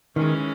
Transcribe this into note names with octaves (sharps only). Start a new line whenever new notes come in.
D#3 E3 G#3 C#4